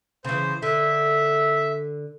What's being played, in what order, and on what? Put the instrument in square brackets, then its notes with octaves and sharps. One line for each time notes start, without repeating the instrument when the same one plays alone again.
[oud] C#3 E3 [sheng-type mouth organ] C5
[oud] D3 [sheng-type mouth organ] E5